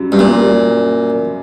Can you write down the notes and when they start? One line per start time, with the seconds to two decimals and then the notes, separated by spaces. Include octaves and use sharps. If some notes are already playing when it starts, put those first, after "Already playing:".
Already playing: F#2 C#3 G3
0.12 G2
0.19 A#2